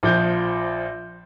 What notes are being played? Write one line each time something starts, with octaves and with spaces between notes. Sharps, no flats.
A#1 F3 G6